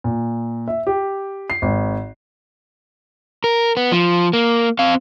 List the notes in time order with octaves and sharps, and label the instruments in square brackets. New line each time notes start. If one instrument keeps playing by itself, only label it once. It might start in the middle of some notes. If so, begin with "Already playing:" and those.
[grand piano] A#2
E5
G4
C7
G#1
[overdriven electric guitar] A#4
B3
F3
A#3
C4 F5